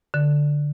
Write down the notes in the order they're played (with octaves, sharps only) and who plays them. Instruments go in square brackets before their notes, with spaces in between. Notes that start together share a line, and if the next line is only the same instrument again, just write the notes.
[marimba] D3